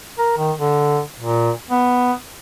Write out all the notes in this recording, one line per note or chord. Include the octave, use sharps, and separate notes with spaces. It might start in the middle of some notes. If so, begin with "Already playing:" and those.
A#4
D#3
D3
A#2
B3